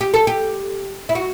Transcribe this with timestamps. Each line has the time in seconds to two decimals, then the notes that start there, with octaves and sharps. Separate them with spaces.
0.01 G4
0.14 A4
0.27 G4
1.09 E4
1.15 F#4